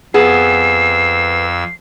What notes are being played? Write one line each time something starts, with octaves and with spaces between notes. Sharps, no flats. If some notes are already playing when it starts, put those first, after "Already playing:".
F2 B3 G#4 E6 C7